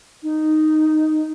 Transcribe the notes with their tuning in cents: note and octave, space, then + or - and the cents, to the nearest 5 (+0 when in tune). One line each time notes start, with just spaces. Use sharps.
D#4 -5